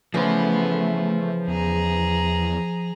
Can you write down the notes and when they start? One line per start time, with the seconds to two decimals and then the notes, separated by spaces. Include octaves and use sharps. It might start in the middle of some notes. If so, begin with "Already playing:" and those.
0.14 C#3 E3 F3 A3 B3 C5
1.48 E2 G#4 A#5